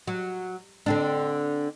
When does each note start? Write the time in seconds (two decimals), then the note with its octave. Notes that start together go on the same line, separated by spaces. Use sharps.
0.07 F#3
0.86 D3 C4 D4